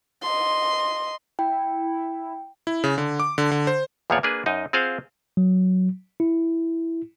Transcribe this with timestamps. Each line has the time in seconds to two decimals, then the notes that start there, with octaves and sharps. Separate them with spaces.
0.22 D#5 C6
1.39 E4 G5
2.67 E4
2.84 C#3
2.98 D3
3.20 D6
3.38 D3
3.51 D3
3.67 C5
4.10 E2 A#2 F3 G#4 C#5 D5
4.23 A#3 D4 G#4 B4
4.46 F#2 D#4 D#5
4.73 C4 F4 G#4 C5 F5 F#5
5.37 F#3
6.20 E4